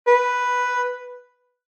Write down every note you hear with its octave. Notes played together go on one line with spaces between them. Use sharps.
B4